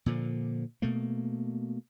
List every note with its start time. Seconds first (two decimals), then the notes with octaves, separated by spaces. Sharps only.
0.06 A#2 D3 F3
0.82 B2 A3 A#3